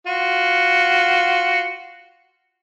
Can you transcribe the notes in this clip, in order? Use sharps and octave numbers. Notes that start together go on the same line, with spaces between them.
F4 F#4